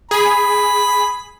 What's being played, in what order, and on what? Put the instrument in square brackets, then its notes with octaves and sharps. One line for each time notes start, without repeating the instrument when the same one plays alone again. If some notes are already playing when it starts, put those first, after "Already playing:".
[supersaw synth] G#4 [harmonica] B5